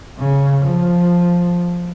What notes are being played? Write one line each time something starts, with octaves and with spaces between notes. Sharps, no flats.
C#3
F3